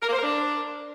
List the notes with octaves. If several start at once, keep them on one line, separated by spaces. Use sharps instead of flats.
A#4
A#3
C5
A#4
D4